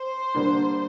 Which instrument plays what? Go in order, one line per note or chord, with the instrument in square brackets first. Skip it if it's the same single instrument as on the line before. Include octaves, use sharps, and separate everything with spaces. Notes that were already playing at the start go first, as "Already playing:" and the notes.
Already playing: [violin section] C5
[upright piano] D3 G3 A#3 D4